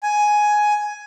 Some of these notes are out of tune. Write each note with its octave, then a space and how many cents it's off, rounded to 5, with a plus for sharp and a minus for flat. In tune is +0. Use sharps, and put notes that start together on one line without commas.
G#5 +10